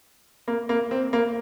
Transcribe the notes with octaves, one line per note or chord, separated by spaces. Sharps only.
A#3
A#3
C4
A#3